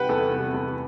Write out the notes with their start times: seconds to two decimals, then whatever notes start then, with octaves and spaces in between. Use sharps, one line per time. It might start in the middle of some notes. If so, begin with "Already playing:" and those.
Already playing: C3 G3 B4 F#5 G5
0.09 E2 A4
0.31 C3 G3
0.54 E2